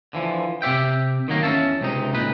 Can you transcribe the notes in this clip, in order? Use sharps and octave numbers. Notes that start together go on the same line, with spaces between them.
D3 E3 F3
C3 G4 C#5 E5 G5
D#3 F#3 A#3
E2 C#4 E5 A5
C#2 C3 D#4
C#2 A#2 D#4 B4